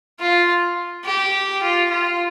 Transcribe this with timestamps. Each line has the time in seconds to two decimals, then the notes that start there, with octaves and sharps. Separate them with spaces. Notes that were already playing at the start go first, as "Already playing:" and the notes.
0.20 F4
1.05 G4
1.62 F4
1.90 F4